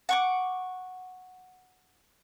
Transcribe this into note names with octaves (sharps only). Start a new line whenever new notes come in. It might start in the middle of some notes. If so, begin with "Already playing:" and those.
F#5 C#6 D6